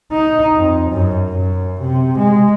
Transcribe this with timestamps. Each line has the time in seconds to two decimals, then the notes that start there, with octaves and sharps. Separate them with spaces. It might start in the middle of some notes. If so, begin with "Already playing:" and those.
0.12 D#4
0.57 F2
0.90 F#2
1.29 F#2
1.81 C3
2.18 G#3